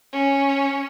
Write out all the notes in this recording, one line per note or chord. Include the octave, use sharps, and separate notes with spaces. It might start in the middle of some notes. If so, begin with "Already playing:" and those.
C#4